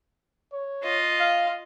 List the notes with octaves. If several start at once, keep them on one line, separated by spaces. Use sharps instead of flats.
C#5
F4 D#5
F5